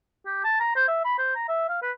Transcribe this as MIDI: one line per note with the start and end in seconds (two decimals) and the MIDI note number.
0.26 0.39 67
0.44 0.59 81
0.60 0.76 82
0.76 0.83 72
0.88 1.04 76
1.05 1.14 83
1.18 1.32 72
1.35 1.44 82
1.48 1.67 76
1.69 1.79 77
1.82 1.91 71